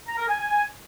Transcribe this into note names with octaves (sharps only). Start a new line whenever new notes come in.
A#5
A#4
G#5
G#5
G#5